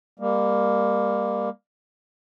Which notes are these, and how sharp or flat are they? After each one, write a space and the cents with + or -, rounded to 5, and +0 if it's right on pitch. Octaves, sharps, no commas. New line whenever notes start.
G3 +35 A#3 +5